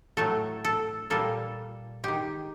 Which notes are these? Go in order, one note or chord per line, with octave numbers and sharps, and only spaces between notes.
A2 F#3 A3 A4
A4
A#2 G3 A#3 A4
D#3 G#3 G4